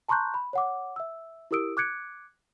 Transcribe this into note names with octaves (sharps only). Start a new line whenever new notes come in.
A5 A#5 C6 C#6 F#6 G6
B5
C#5 F#5 D6
E5 E6
E4 G4 A#4 D#6 E6 D7
D6 F#6 G#6 C#7 D7